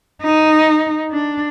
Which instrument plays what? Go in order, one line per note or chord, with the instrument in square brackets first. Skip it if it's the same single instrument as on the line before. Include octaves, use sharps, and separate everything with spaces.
[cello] D#4
D4